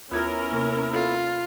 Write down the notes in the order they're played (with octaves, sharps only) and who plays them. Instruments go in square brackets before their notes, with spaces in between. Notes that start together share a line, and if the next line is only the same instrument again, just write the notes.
[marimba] D#2 F4 G#6 [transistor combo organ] B3 E4 [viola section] C#4 A#4
[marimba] C3 A#3
[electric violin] F4 [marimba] A4